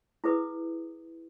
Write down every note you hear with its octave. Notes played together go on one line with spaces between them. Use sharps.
E4 G#4 B4 D#6